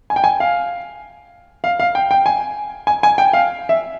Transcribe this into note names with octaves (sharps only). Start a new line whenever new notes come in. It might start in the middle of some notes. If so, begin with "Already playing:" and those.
G#5
G5
G#5
F5
F5
F5
G5
G5
G#5
G#5
G#5
G5
F5
E5